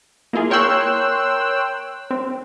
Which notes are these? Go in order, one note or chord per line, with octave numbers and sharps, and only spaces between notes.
A#3 E4 F4 G#4
A#4 C#5 G5 C6 E6 F#6
C4